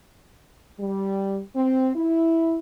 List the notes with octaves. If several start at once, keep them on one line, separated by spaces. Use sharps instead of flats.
G3
C4
E4